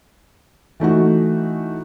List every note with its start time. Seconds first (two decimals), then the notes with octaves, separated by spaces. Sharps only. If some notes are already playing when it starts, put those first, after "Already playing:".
0.80 E3 A3 D#4 F#4